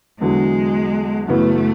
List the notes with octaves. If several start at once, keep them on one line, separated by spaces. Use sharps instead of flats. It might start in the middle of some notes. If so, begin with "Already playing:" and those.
E2 D3 F#3 G#3
F#2 C#3 E3 A3 B3